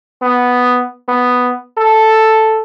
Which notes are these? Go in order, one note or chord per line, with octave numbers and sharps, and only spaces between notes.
B3
B3
A4